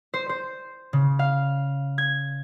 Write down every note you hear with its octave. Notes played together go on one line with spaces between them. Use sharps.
C5
C5
C#3
F5
G#6